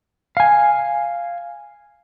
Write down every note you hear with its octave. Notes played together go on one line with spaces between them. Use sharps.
F5 G#5